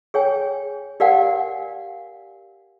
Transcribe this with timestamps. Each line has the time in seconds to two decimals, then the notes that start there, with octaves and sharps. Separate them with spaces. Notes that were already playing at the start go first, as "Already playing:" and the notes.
0.14 G#4 C#5 G5 G#5
1.00 G4 A#4 D5 F5 F#5 G#5